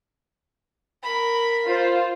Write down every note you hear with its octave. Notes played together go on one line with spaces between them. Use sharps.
A#4 B5
F4 C5